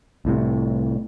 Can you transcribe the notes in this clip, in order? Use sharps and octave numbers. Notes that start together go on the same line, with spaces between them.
C2 A2 C3